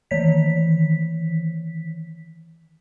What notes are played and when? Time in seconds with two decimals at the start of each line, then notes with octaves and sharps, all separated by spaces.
0.11 D#3 E3 B6